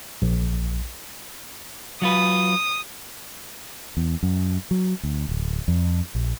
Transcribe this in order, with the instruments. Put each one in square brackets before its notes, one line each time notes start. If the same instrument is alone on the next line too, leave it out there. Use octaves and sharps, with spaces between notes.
[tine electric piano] A#1
[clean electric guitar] F#3 F4 B4 [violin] D#6
[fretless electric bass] E2
F#2
F#3
D2
D1
F2
A#1